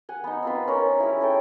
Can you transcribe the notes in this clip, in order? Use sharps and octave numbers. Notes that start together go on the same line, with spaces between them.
F#5 G#5
B3 D#4
C4 F4 B4
C#4 A#4
E4 G#4
C#4 A4 G5